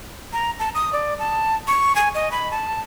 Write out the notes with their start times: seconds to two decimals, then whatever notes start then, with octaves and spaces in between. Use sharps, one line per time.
0.33 A#5
0.59 A5
0.75 D#6
0.93 D5
1.19 A5
1.68 C#6
1.95 G#5
2.15 D#5
2.32 B5
2.51 A5